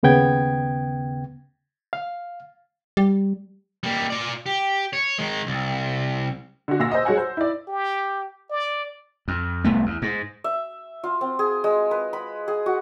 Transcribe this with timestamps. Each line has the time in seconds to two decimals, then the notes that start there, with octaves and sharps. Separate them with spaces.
0.03 D#2 C#3 B3 G5 G#6
1.93 F5
2.97 G3
3.84 G3 A#3
4.10 F4 D5
4.46 G4
4.93 C#5
5.18 D#3 G#3
5.47 C2
6.68 D3 F#4
6.79 A#2 F#4 F5 E6 A#6
6.91 C5 D#5
7.05 G#3 F#4 C#5 F#5 G#5
7.18 C5
7.37 E4 D5
7.68 G4
8.50 D5
9.28 F2
9.64 C2 A3 B3
9.86 E2
10.02 G#2
10.44 E5
11.04 F4
11.21 C4
11.39 G#4
11.64 G#3
11.91 B4
12.13 B5
12.48 G#4
12.66 F#4